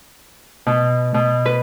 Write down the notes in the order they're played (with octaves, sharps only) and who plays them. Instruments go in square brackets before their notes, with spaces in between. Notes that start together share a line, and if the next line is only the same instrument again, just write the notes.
[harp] B2
B2
B4